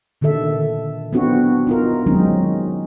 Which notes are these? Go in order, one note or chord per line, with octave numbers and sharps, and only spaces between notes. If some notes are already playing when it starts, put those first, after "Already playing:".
A#2 D3 D#3 A4 E5
B3 C4 D4 E4 F#4
D#4 F4 A#4
D#3 F#3 G#3 C4 C#4 D#4